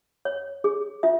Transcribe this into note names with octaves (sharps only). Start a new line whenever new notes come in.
C#5
G#4
F4 E5